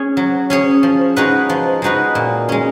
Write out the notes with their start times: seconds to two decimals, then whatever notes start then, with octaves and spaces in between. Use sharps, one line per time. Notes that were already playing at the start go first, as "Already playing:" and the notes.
Already playing: C#4 G#4 C#5
0.17 F#3
0.50 C#4 G#4 C#5
0.83 F3
1.16 G#3 D#4 F#4 B4
1.49 F3
1.82 G#3 D#4 F#4 B4
2.15 A#2
2.49 G#3 C#4